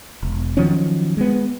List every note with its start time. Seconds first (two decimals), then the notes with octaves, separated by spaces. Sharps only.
0.23 E1
0.57 D#3 F3 F#3 C#4
1.17 G#3 B3